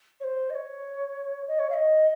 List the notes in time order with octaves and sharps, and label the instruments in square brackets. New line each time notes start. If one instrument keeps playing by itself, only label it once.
[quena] C#5
C5
D#5
C#5
D#5
C#5
F5
D#5